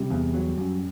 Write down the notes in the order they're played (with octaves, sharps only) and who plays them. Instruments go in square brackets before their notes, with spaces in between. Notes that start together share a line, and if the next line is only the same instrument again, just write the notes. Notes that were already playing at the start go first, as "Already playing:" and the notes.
Already playing: [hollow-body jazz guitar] C3 [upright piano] G3
[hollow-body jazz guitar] E2
F#3
F#2